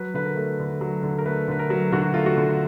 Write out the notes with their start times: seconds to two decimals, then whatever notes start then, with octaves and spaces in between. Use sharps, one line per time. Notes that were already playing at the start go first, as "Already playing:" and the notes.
Already playing: F#3 B4
0.14 D3 B4
0.25 A#4
0.37 A3
0.59 D3
0.81 F#3
1.03 D3
1.18 A#4
1.26 A3 B4
1.48 D3 B4
1.59 A#4
1.70 F#3
1.92 D3 F#4
2.14 A3 F4
2.26 F#4
2.37 D3